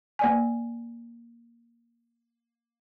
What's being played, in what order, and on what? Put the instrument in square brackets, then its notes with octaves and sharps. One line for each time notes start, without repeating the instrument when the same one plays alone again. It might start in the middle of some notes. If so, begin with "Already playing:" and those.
[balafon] A#3 D5 G#5